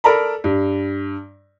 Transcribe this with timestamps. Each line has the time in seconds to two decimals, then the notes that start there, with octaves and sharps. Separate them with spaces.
0.04 A4 A#4 D5 A#5 B5
0.44 G2